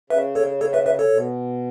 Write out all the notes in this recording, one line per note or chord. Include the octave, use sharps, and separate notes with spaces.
C#3 B4 E5
A4 C#5
A4 C#5
B4 E5
B4 E5
A4 C#5
B2